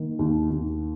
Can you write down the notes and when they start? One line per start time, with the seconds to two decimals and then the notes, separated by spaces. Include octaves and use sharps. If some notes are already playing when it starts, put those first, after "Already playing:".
Already playing: D#3 A#3
0.19 D#2
0.50 D#2